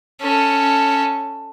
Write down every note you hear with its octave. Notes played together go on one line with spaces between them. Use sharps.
C#4 A4